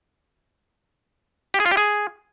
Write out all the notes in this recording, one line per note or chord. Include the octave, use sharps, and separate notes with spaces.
G4
G#4
F4
G4
G#4